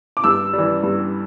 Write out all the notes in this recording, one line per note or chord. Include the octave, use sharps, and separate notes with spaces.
D6
G2 E6
E3 G3
G2